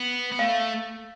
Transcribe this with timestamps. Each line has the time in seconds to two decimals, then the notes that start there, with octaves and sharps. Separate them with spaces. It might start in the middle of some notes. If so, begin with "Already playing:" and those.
Already playing: B3
0.32 B3
0.39 A3 F5